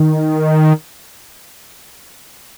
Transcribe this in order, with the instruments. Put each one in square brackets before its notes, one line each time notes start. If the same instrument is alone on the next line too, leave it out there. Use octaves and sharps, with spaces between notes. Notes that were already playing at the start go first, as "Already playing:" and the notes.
Already playing: [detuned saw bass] D#3